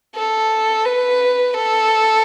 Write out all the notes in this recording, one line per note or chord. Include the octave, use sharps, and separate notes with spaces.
A4
B4
A4